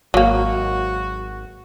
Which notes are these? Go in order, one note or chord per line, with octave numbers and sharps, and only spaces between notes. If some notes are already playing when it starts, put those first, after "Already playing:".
G#1 F#3 A#3 F#4